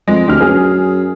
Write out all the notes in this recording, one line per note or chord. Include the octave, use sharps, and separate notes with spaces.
F2 G#3
D2 G4 F6
F#2 G#4